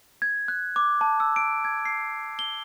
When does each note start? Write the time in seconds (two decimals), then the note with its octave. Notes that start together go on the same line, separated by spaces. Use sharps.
0.22 G#6
0.48 F#6
0.76 D6
1.01 A5
1.20 E6
1.36 D7
1.65 G#6
1.85 C7
2.39 G7